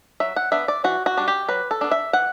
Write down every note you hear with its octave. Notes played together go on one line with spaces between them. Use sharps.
F#3 E5
F#5
B3 D4 E5
D5
E3 F#4
F#4
G3 D4
G4
F#3 B4
A4
B3 D4
E5
E3 F#5